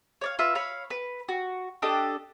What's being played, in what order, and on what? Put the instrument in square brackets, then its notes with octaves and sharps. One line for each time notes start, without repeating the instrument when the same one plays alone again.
[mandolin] C#5 D5 F5
F4 B4 E5
C#5 F5 B5
B4
F#4
D4 G4 A4 D#5